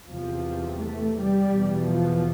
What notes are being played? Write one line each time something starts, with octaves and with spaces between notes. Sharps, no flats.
E2 C3 F3
A3
G3
E2 B2
F3